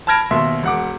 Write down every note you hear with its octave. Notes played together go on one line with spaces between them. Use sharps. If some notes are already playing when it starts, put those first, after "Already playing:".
A5 B5 F6 G#6 A#6 D7
D#2 B2 E5 C6
E1 F#5 D6